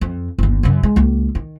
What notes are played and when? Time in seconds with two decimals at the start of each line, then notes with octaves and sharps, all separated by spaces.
0.01 F2
0.38 G1 D#2
0.63 F#2 C#3
0.83 G#3
0.96 C#2 A#3
1.35 D#3